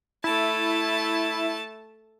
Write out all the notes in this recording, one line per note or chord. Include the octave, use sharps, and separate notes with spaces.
A3 E4 A5